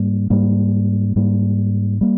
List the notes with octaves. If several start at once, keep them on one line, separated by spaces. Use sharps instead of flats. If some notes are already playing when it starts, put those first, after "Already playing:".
Already playing: G#2 G3 A#3
G#2 G3 A#3
G#2 G3 A#3
G3 A#3